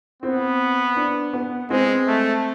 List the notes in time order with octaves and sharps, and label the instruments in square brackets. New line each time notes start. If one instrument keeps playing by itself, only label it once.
[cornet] B3 [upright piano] C4
[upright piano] D4
B3
[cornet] G#3 [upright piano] C4
[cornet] A3